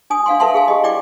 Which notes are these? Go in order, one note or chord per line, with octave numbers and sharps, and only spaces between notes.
D4 G#5 D#6
D4 F5 F#5 G#5 C6
A4 B4 E5 F#5 A5 C6
G#4 F5 G#5
G4 D#5
E4 D5 G5 D6